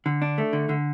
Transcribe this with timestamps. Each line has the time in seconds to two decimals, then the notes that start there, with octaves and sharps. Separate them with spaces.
0.06 D3
0.22 D4
0.38 A3
0.53 D3
0.69 D3